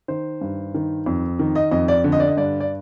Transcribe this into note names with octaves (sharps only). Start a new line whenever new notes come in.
D#3 C5
G2
D#3
F2
D#3
D#5
F2 D#5
D5
D3
D#5
D5
D#5
G2 D5
D5